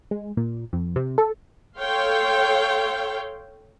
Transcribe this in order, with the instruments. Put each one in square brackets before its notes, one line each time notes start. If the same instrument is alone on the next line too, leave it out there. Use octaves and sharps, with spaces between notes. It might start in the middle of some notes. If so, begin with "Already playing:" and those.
[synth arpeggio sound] G#3
A#2
F2
C3
A4
[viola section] A4 C#5 F5 G5 C6